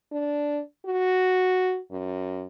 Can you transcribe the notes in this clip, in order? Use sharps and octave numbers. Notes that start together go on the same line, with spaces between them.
D4
F#4
F#2